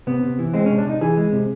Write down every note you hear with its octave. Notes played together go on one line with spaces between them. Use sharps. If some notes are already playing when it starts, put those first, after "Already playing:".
C3 B3
C3
E3
G#3 C4
C#4
C3
D4
C3 D#4
E3 G#4
G#3
C3